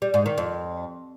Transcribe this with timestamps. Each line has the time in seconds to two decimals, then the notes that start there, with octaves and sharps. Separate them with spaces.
0.02 G3
0.14 G#2
0.26 D#3
0.38 F2